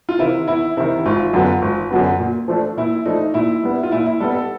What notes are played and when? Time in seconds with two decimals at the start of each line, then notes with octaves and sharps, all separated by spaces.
0.09 F4
0.19 C3 D#3 E4
0.48 E2 E4
0.77 C3 D#3 E4
0.98 E4
1.06 G#1 F4
1.33 F#2 D3 F#3 B3
1.62 G#1
1.91 F#2 D3 F#3 B3
2.20 A#2
2.48 F3 A3 D4
2.77 A#2 E4
3.05 F3 A3 D4 D#4
3.34 A#2 E4
3.63 G3 B3
3.83 F4
3.91 A#2 E4
4.06 E4
4.20 G3 B3 A4
4.35 A4